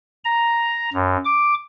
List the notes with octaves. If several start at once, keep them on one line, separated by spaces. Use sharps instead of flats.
A#5
F#2
D6